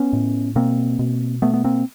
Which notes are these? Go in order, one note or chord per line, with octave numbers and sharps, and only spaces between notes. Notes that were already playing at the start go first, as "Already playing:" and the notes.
Already playing: B3 C#4
A2
B2 A#3 C4
B2
B2 A3 B3
B3
A#3 C4